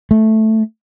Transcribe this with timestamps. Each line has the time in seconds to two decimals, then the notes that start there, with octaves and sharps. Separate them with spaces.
0.11 A3